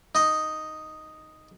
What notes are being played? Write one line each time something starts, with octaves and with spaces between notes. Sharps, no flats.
D#4 D#5